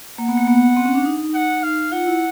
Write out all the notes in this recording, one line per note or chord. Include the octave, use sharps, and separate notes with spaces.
A#3 F#5
B3
A#3
B3
C4
C#4
D4
D#4
F#5
F5
F4 F#5
E4